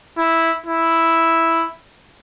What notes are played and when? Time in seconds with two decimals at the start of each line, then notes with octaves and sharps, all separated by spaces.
0.18 E4
0.66 E4